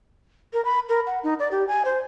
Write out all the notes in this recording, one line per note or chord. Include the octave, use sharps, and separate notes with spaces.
A#4
B5
A#4
F#5
D#4
D5
G4
G#5
C5